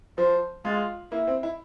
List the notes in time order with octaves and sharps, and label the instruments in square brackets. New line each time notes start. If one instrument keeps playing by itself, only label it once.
[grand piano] F3 [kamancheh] C5
[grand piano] G#3 [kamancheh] F4
[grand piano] A#3 [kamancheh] E4
[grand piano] C4
E4